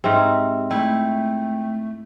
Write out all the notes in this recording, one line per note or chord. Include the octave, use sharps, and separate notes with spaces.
G#2 C4 G4 E5
A3 E4 G5